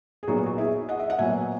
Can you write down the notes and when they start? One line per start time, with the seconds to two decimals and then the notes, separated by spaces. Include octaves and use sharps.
0.23 G#4
0.27 A#2 F#3 B3 D#4 F#4
0.46 F#4
0.58 E4 G#4
0.89 D#5 F#5
1.00 E5
1.10 F#5
1.18 A#2 F#3 B3 E5 G#5